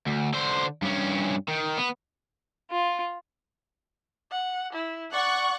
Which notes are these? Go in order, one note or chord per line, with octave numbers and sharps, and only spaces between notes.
D2
D3 C5
G2 C#4
D#3
B3
F4
F#5
E4
D5 F#5 C#6 F#6